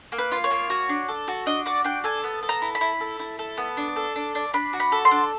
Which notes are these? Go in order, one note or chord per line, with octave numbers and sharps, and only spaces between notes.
A#3
B4
F4
C#5
A#3
F#4
D4
A4
F#4
D4 D#5
F#4 D5
D4 G5
A4 G#5
B3
A4
A#5
E4
B5
E4
A4
E4
A4
B3
D4
A4
D4
D4
D4 B5
F#4
B5
A4
C6
D4